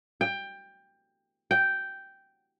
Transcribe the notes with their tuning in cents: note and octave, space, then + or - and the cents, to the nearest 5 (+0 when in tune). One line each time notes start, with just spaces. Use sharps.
G5 +15
G5 -5